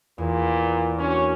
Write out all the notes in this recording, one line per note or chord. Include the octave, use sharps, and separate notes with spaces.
E2 A#2
A#3 C#4 D4 F#4